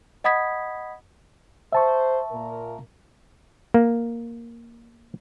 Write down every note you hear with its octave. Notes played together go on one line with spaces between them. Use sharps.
D#5 F#5 B5 D#6 G#6 B6
C5 E5 A5 C#6
A#2 A#4
A#3